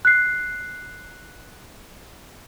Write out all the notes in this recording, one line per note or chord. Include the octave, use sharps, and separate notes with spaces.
F#6 C7